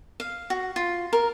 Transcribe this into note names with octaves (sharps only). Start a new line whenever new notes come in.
F5
F#4
F4
A#4